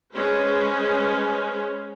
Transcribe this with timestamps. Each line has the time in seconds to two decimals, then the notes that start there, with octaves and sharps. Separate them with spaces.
0.12 G#3 C#4 B4 C5